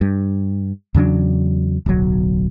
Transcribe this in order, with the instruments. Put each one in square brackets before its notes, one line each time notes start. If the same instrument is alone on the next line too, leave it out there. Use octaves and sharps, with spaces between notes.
[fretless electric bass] G2
E2 C#3 F#3 D4
D1 B1 F#3